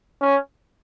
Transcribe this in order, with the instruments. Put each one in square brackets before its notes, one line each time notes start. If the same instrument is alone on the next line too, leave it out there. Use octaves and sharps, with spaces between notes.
[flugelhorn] C#4